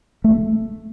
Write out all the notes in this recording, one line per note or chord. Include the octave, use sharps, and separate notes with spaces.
A3